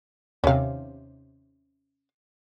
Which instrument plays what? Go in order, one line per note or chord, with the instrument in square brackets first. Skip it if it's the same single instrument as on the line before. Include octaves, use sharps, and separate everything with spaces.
[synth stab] D#2 C3 [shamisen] C#4 F5